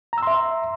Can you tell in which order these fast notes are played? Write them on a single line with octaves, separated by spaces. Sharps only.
A#5 E6 C6 E5